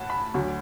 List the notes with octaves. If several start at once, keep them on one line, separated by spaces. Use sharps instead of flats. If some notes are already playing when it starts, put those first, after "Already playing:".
Already playing: A2 F#5 A5
B5
D2 D3 F#3